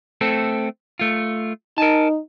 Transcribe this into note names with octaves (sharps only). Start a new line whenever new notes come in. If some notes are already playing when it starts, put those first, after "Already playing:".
A3 C4 A4
A3 F4
D#4 A#4 G#5 A5